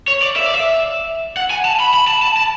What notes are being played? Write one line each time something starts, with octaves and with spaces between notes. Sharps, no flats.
C#5
D5
E5
D5
E5
F#5
G#5
A5
B5
B5
A5
A5
A5